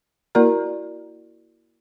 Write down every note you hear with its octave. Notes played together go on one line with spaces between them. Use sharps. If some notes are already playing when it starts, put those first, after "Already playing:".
A#3 E4 F#4 A#4 D5 A#5